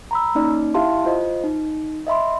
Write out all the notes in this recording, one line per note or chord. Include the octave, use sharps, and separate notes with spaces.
A#5 B5 E6
A#3 C#4 D#4 D5
E4 G4 E5 F5 A5 C6
F4 C5 D#5
D#4
D#5 E5 B5 C6